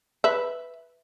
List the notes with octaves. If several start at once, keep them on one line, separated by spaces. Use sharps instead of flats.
B4 E5